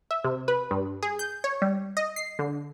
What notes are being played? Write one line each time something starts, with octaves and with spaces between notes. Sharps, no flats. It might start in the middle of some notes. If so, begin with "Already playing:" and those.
E5
C3
B4
G2
G#4
G6
C#5
G3
D#5
C7
D3